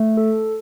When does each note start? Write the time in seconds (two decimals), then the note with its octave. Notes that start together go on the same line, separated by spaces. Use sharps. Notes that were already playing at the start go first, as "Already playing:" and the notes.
Already playing: A3
0.17 A4